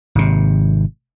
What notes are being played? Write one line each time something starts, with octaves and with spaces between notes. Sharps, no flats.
G#1 C3